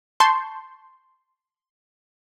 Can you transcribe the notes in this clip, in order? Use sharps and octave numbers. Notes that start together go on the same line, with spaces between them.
A5 C6 C#6 G6